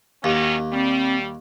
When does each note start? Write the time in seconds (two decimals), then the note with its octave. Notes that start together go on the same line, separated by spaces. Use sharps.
0.24 D#2 D#3 F#3 C#4
0.72 G3 C4